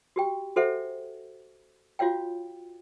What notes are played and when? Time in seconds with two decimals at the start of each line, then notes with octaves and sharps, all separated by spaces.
0.16 F#4 G4 G5
0.56 F#4 A4 C5 E5 F#5
1.99 F4 F#4 C#5 F5 G5